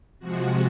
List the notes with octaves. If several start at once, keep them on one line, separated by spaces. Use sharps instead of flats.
C3 F3 G#3 F#4